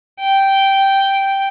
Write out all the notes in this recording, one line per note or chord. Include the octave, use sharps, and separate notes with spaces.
G5